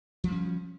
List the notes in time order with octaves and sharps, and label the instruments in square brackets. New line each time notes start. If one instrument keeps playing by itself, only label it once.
[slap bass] F3
G3
C#4